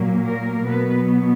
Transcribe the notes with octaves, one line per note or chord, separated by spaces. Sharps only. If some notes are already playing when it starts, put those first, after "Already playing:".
Already playing: A#2 F#3 A#3
A#4
B2 F#3 B3 B4